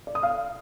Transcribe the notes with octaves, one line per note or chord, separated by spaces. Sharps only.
D5
D#6
F5